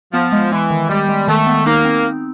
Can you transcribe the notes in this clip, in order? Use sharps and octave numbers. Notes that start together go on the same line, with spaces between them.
F3 B3
G#3
E3 G#3
D#3
G3 G#3
G#3
D#3 A3
B3
A#3 D#4
C4